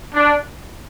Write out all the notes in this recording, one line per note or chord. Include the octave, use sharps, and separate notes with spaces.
D4